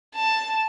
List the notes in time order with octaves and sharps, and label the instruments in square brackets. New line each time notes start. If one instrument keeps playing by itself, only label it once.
[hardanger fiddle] A5